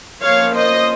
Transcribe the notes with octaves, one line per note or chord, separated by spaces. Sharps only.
F3 A#3 C#4 C#5 F5
C5 D#5